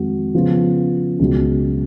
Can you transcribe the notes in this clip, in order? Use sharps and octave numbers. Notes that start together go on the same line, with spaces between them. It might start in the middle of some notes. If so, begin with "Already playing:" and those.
Already playing: F2 D#3 G#3 F#4
C#3 F3 B3 F4
C#2 B2 F#3